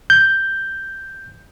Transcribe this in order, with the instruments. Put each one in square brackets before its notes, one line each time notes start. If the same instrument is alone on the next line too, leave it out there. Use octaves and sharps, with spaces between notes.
[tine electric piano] G6